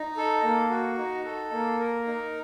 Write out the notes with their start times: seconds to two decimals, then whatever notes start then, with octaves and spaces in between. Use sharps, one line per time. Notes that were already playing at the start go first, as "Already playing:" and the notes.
Already playing: D#4
0.17 A4
0.43 A#3
0.70 F#4
0.98 D#4
1.25 A4
1.52 A#3
1.79 A#4
2.07 D#4